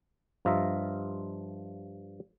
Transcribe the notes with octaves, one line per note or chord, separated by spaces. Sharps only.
G2 F3 F4 D#5 E5 A#5